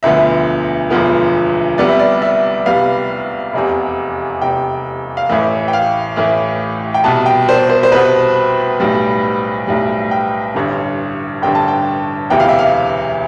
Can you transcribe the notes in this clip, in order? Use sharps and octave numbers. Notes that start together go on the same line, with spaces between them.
E1 D2 D3 F3 B3 E5
E1 D2 D3 F3 B3
C2 C3 G3 B3 D5
E5
D5
E5
C2 C3 G3 B3 F5
F1 E2 C3
F1 E2 C3 G5
F5
A1 A2 E3 A3 E5
G5
F5
A1 A2 E3 A3
G5
C2 B2 B3 A5
G5
C5
C5
C5
C2 B2 B3 B4
B1 A2 G3
B1 A2 G3
G5
A1 G2 D3
A1 G2 D3 G5
A5
G5
E1 D2 C3 E3 B3 G5
F5
E5
F5